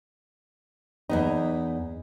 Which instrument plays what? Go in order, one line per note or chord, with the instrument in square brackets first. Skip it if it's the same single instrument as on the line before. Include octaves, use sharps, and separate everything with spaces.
[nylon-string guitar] E2 B3 D#4